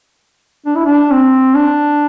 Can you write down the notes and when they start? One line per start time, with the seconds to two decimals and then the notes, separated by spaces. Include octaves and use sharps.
0.66 D4
0.75 E4
0.85 D4
1.11 C4
1.55 D4